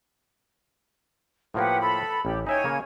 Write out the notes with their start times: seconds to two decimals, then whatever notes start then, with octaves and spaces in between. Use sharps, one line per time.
1.54 A2 F3 A#3 G4 B4 F#5
1.80 A4 B5
2.25 A1 G4
2.47 D#4 C#5 E5 G5 G#5
2.64 C#3 A#3